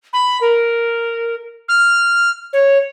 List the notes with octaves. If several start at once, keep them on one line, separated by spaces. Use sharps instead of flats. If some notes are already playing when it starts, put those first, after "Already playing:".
B5
A#4
F6
C#5